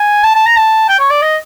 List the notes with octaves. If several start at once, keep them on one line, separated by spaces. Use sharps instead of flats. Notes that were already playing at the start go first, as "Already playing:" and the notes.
Already playing: G#5
A5
A5
A#5
A5
G5
C#5
D5
D#5